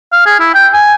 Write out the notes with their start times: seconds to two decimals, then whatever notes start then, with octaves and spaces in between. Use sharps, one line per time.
0.13 F5
0.26 G#4
0.40 E4
0.55 G5
0.73 G#5